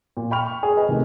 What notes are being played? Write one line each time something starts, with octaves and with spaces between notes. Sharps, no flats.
A#2
G5 B5 C#6 F6 F7
C#6
G#4
B4 D#5
C3 D#3 A3